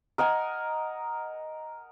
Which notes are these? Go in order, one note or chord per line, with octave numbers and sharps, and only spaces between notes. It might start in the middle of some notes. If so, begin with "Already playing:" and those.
A#4 D#5 F#5 G#5